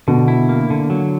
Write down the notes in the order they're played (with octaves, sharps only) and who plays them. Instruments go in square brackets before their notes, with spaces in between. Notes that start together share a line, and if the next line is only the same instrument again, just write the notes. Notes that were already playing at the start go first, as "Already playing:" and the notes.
[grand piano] B2 [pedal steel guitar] D3
[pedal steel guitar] E4
A#3
D3
F#3